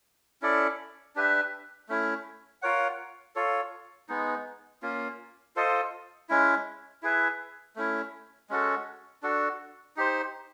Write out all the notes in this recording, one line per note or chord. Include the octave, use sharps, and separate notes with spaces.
C#4 E4 A4 D5
D4 G4 B4 E5
A3 C#4 E4
F4 A#4 C#5 F#5
F4 A4 C#5
G#3 B3 D#4
A#3 C#4 F4
F4 A4 C5 D#5
G#3 C#4 E4
E4 G#4 B4 E5
A3 C#4 E4
G#3 C#4 F#4 A4
D4 F#4 A4
D#4 G4 C5